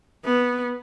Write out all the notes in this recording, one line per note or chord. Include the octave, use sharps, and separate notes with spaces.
B3